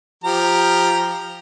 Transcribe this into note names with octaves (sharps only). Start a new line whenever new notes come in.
F3 G4 A#5